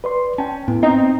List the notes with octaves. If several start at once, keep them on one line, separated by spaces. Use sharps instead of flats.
B4 D5 C6
C#4 G5 A5
A2 B3
C4 D#4